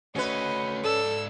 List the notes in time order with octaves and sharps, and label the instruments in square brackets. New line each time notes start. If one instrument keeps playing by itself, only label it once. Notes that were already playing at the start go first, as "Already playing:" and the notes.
[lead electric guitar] A3 F#4 [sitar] C#4 B4 [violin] D#5
[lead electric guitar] G#2 D5 [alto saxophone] A4 [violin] E6